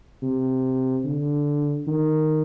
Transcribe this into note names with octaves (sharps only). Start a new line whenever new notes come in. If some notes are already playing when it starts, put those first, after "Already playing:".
C3
D3
D#3